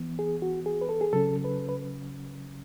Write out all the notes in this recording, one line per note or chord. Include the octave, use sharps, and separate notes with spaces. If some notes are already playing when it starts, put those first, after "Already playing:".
Already playing: E3 B3
G#4
F#4
G#4
B4
A4
G#4
C#3 F#3 C#4 A4
B4
B4